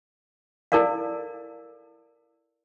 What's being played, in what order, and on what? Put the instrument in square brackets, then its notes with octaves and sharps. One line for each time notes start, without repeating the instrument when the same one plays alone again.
[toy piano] E4 A4 A#4 D5 F5